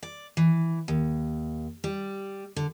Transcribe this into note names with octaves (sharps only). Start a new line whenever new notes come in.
D5
E3
D#2
G3
D3